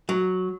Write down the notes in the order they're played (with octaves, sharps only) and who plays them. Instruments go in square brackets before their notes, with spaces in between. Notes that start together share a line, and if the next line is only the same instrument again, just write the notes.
[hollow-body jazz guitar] F#3